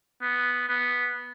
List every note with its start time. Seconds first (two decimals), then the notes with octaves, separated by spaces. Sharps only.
0.22 B3
0.69 B3